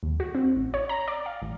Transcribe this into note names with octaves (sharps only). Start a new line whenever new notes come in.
D#2
F#4
C4
A1
C#5
A#5
D5
F5
A1